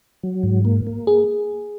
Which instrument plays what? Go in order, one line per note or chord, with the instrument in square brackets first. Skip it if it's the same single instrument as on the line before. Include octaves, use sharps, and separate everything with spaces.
[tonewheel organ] F#3
G#2
A#3
A#3
[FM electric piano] G#4